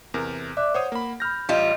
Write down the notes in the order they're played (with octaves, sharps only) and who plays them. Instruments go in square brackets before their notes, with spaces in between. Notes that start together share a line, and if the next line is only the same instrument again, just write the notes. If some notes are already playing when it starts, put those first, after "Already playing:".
[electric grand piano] E2 C3 A#4
[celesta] D5 D6 F#6 [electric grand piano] E5
[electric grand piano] C5 C#5 D#6 [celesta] F#5
[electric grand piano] A#3 B5
[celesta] B5 G6 [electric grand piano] F6 A#6
[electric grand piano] A1 [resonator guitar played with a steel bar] G3 F4 [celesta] D#5